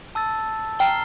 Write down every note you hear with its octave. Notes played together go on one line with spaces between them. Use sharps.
A5 E6 A6
G5 A#5 F6 C7 G7